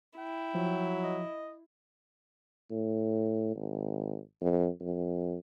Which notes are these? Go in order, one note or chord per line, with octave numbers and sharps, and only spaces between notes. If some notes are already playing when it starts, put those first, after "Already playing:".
E4 G5
F3 F#3
D#5
A2
G#1
F2
F2